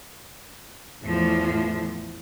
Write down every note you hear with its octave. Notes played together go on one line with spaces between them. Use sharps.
E2 A2 F3